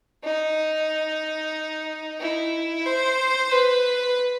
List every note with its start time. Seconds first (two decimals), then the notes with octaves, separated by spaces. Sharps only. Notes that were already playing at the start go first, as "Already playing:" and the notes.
0.24 D#4
2.20 E4
2.86 C5
3.52 B4